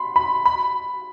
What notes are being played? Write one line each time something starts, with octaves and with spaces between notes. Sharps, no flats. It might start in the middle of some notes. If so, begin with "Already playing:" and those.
Already playing: B5 C6
B5
B5